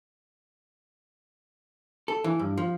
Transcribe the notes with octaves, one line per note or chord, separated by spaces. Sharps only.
A4
E3
G2
F3